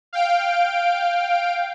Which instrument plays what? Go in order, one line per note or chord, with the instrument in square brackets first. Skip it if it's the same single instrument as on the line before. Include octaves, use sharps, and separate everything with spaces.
[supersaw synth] F5 G5 D7